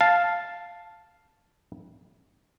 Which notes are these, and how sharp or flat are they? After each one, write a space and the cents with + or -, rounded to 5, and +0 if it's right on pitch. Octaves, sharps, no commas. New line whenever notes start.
F5 +0 A5 +0